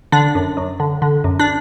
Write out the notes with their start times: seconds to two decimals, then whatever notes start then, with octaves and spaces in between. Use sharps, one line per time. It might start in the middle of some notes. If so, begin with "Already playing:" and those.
0.12 D3 D4
0.35 F#2
0.57 F#2
0.80 D3
1.02 D3
1.24 F#2
1.39 D4